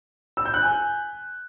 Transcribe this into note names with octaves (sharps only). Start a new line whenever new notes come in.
E6
G6
F#6
G#5